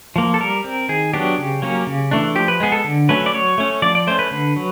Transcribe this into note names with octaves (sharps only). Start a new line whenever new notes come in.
F3 A#3
A4
G3 A#4
C4
D#3 G#4
F#3 B3 D4 G4
C#3
F#3 A#3 C#4
C#3
E3 A3 D4
F3 G4
B4
G#3 B3 G#4
A4
D3
F#3 A3 C#4 B4
D5
F#3 C#5
A3 C#4
F3 D5
D5
A3 C#4 C5
B4
D3
F#3